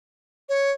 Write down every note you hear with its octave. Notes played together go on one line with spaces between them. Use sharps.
C#5